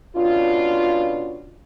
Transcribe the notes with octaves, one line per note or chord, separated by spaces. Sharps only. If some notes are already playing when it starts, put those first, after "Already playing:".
B2 C#4 D4 F4